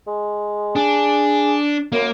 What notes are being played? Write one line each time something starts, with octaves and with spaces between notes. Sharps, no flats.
G#3
D4 G#4
F#2 A#3